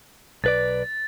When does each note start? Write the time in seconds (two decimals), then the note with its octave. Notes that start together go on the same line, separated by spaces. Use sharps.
0.44 B1 B4 D5 A6